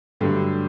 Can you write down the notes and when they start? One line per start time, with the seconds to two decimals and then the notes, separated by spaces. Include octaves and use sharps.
0.20 G2 D3 F#3 A3 G4